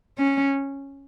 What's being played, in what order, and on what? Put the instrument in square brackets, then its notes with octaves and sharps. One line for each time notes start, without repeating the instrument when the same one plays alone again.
[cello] C#4